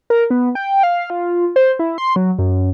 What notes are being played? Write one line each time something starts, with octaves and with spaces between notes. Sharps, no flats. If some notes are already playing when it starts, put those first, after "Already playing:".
A#4
B3
G5
F5
F4
C5
E4
C6
F#3
F#2